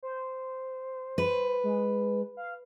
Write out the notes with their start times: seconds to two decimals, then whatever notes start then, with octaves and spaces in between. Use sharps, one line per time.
0.03 C5
1.18 B4
1.64 G#3
2.37 F5